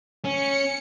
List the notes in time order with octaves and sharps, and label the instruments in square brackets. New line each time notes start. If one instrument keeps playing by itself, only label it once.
[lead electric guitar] C#4 [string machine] C#7